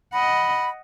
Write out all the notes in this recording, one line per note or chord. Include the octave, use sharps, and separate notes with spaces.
D#5 F#5 B5